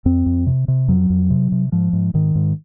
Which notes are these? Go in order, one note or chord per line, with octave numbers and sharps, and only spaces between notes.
F2 C4
F2
C3
C3
F2 F#3
F2
C3
C3
G#2 F3
G#2
G#2 D#3
G#2